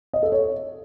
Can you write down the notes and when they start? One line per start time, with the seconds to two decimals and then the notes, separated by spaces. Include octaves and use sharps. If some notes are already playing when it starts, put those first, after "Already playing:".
0.13 D#5
0.23 A4
0.32 C#5